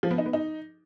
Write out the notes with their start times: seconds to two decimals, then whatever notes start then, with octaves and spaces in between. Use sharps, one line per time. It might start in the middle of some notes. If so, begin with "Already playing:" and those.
0.03 F3
0.11 B3
0.18 D#4
0.26 B3
0.33 D#4